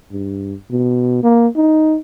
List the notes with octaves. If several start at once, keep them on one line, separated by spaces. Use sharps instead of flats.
G2
B2
A#3
D#4